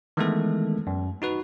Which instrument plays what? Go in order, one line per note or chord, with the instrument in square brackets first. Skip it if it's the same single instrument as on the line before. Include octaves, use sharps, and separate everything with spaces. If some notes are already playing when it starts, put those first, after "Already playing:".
[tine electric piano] D#3 E3 G#3 A3 B3 A4
F#2
D#4 F#4 B4